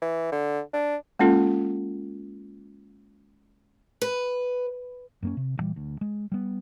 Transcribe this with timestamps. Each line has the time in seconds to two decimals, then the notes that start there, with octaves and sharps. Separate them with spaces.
0.02 E3
0.32 D3
0.73 D4
1.19 G#3 A#3 C#4 F4 A4
4.01 B4
5.22 F#2 A#3 C#4
5.37 C3
5.58 D2 A#2 E3 G3
5.76 D2
6.01 G#3
6.32 G3 B3